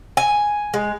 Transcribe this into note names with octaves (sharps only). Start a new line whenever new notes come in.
G#5
G#3